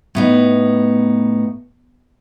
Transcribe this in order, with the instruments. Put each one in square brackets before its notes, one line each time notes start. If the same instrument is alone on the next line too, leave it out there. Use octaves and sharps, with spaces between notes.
[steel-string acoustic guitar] A2 B3 D#4